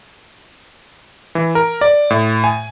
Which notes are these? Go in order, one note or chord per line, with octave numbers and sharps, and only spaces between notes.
E3
A#4
D5
A2
G#5